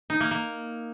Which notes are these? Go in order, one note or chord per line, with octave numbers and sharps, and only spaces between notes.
D#4
A#3
A#3